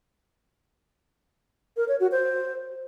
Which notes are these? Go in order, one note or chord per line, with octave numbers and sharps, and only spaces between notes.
A#4
C#5
F#4
C5